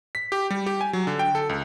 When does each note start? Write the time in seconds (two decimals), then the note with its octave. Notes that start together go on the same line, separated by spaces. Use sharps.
0.15 B6
0.32 G4
0.50 G3
0.66 G4
0.81 G#5
0.93 F#3
1.07 D3
1.19 G5
1.35 A4
1.49 C#2